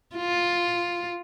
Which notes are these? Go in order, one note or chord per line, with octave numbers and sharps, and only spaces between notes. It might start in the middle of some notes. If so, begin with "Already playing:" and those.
F4